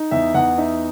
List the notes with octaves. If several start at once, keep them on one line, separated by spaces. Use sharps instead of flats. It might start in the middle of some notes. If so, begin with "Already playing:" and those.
Already playing: D#4
E2 E5
E2 F#5
D#4 E5